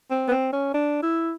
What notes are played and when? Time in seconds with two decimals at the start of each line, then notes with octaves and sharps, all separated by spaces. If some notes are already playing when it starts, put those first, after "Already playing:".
0.11 C4
0.28 B3
0.31 C4
0.53 C#4
0.74 D4
1.03 E4